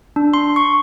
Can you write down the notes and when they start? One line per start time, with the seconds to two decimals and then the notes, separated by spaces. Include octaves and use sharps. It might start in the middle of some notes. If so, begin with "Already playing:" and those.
0.16 D4
0.34 C6
0.56 C#6